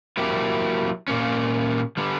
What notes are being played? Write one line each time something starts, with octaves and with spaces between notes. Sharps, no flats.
F#3 A#3 E4 G4
A#2 A#3 C#4
D3 G3 B3